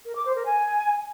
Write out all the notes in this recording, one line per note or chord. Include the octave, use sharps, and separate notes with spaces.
A#4
D6
C5
A#4
G#5